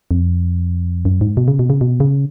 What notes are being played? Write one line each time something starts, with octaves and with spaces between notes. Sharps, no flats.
F2
F#2
G#2
B2
C#3
B2
C#3
B2
C#3